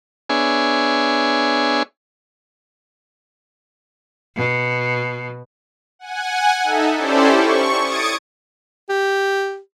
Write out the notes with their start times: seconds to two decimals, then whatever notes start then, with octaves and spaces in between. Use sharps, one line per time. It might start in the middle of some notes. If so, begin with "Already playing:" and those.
0.29 B3 D4 G#4 C#5 E5 G#5
4.35 B2
5.99 F#5 G#5
6.63 D#4 A4 E5
6.97 C#4 E4 G4 A4 C5 D5
7.35 C#6
7.81 D#6 G#6 A6 C#7 D7
8.89 G4